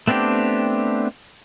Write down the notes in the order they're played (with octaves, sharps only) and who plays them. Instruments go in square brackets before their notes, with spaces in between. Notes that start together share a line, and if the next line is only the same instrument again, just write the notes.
[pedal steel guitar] A3 B3 C4 D4 G4